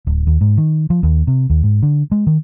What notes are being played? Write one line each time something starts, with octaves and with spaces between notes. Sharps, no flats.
D1
D#2
G#2
D#3
F3
D#2
C3
D#2
G#2
D3
G#3
D#3